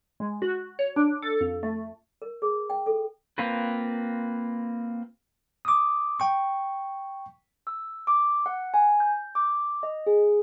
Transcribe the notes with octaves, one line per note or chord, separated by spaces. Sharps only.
G#3
F#4
C#5
D4
A4
F2
A3
A#4
G#4
G5
A4
A#3 C4 F4 A#4 B4
D6 D#6
G5 C#6
E6
D6
F#5
G#5
G6
D6
D#5
G#4